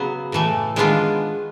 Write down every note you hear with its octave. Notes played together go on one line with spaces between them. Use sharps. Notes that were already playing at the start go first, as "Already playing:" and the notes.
Already playing: C#3 F#3 B3
A2 E3 A3
D#3 G#3 B3 D4 F4